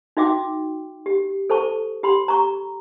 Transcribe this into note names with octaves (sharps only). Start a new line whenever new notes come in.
D#4 F#4 E5 G5 D6
G4
A4 C5 A5 C#6
G4 B5 C6
A#5 C#6